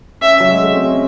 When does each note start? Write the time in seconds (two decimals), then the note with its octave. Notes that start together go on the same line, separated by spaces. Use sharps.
0.21 C#4 E5
0.40 F#3
0.51 G#3
0.62 A3
0.73 C4
0.84 C#4